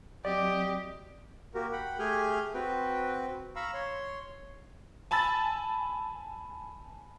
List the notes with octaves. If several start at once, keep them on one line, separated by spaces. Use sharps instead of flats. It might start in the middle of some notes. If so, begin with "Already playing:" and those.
F#3 C4 F#4 G4 D5 D#5
A#3 F#4 G4 A#4
F#5 G5 B5
A3 G4 G#4 G#5 F6 G6
C4 F#4 B4 G5
F5 A#5 B5 C#6 E6
C#5 C6
G#5 A5 B5 E6 A6